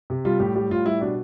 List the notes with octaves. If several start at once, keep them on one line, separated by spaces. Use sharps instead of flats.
C3
G3 F4
A2 G4
G3 G4
A2 F4
G3 E4
B2 D4